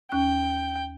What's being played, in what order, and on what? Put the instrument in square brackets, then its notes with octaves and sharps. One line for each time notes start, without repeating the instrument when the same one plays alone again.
[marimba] D#2 C#4 F#6 [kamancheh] G5